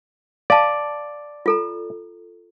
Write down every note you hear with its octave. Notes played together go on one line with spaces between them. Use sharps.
D5 F5 A5
F4 A4 A#5